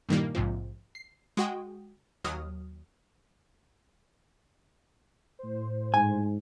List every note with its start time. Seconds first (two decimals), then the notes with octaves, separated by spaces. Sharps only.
0.09 G2 A#2 D#3 E3 G3 A#3
0.35 A#1 G#2 C3 F3
0.95 C7
1.37 G#3 F#4 G5 D#6
2.24 D#2 F#3 D#6 F6
5.39 A2 C5
5.94 G#2 G#5